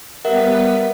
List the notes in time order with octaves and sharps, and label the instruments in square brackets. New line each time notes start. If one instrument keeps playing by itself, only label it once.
[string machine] G3 B3 B4 [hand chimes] A#4 E5 F#5